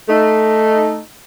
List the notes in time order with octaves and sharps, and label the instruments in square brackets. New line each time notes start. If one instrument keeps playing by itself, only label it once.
[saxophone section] A3 D#4